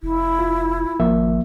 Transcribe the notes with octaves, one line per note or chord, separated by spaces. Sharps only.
F1 E4
F4
G#1 F3 A#3 E5